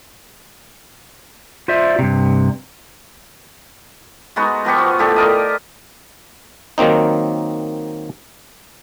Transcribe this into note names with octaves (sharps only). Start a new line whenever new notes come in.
F4 C5 D5 E5
G2 C3
G#3 B3 D#4 F#4
F3 B3 G4 C#6
F#4
A2 D3 G4 A4
F4 A#4 D#5
D#3 F#3 A#3 C4 D#4